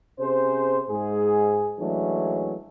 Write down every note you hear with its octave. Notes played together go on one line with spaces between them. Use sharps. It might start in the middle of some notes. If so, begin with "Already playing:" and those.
C3 C#4 G#4 C5
G#2 G#4
E3 F#3 G#3 A3 C#4 D4